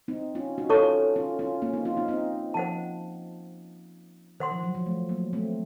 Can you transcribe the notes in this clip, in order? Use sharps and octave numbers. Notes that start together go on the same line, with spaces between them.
C4 D#4
C#4 F4
D#4 F#4
C#4 F4 A4 C#5 A5 C#6
C#4 F4
C#4 F4
A#3 C#4
C4 D#4
C#4 F4
C4 D#4
C4 D#4
F3 C5 F#5 A5
D#3 C5 F#5 C6
F3
F#3
F3
A3
F#3 A#3
A3 C4